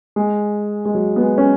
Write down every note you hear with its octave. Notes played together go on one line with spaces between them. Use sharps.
G#3
G#3
F#3
B3
G#3
C#4